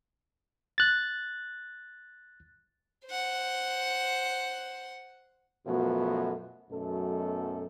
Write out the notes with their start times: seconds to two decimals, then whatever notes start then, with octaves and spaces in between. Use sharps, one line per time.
0.78 F#6 A6
3.06 C5 F#5
5.66 F#2 B2 F3 A3 B3 F#4
6.70 B1 F#2 B2 A3 A4